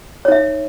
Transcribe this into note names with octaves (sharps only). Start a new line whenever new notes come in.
D#4 C#5 E5